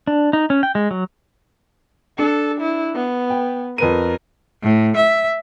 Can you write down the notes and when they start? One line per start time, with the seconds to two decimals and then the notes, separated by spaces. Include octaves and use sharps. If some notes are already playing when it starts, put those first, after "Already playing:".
0.07 D4
0.33 D#4
0.50 C#4
0.63 G5
0.75 G#3
0.91 F#3
2.18 D4 A4 C#7
2.61 E4
2.95 B3
3.30 G5
3.78 F2 A#4 B4 D#7
4.62 A2
4.96 E5